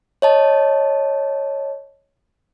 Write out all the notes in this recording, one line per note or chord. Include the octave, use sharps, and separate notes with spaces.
C#5 D#5 A5